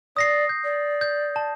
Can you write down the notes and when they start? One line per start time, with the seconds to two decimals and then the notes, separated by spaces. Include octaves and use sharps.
0.17 D5 D#6 A#6 C7
0.49 G6
0.64 D5
1.01 G6
1.36 A5